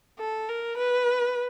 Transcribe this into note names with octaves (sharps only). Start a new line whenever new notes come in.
A4
A#4
B4